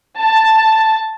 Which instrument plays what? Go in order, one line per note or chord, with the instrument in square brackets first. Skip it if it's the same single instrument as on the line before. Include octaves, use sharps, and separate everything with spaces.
[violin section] A5